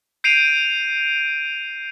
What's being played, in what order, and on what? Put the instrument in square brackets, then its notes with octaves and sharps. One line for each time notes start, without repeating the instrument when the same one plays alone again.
[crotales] G6 C7 D7 D#7 F7